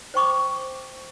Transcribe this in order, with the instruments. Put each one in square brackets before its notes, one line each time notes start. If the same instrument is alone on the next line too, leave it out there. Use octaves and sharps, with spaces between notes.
[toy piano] C5 G5 C#6 D6